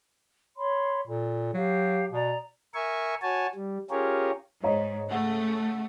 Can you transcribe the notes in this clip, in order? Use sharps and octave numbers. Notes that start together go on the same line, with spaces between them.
C#5 B5 C6
A#2 A4
F#3 G4 F5
B2 D5 A#5
A#4 E5 G#5 C#6
F#4 C#5 G#5 A5
G3
C#4 F4 G4 G#4 A#4 C#5
G#2 C#5 D#5 A#5
C#3 A3 F#5